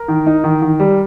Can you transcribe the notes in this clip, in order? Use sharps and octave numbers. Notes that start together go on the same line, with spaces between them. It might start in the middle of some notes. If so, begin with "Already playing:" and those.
Already playing: A#4
D#3
D#4
D#3
D#3
G3